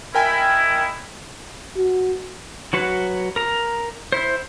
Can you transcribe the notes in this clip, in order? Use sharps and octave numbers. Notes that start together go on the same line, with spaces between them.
D#4 E4 A#4 G5 G#5
F#4
F#3 F#4 B4 F#5
A#4 A#5
E4 C5